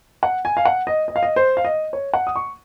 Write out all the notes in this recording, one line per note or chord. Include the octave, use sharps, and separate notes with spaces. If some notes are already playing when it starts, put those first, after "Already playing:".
F#5
G#5
F5
F#5
D#5
D#5
F5
D#5
C5
F5
D#5
C#5
F#5
D#6
C#6